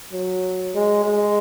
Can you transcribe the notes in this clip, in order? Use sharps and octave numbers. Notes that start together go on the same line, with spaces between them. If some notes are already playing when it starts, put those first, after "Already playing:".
F#3
G#3
G#3